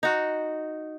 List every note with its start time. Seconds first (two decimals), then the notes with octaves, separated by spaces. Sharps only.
0.03 D#4 F#4